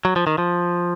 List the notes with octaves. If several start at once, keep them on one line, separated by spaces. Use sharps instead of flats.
F#3
F3
D#3
F3